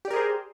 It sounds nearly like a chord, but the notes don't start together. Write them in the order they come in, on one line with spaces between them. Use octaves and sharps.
G4 D5 A#4 G#4 C5